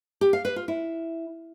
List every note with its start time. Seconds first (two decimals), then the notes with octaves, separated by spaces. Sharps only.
0.21 G4
0.33 F5
0.45 B4
0.56 F4
0.68 E4